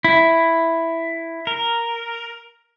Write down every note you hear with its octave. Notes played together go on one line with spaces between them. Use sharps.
E4
A#4